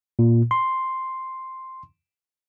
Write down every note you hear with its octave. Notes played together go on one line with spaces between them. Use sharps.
A#2
C6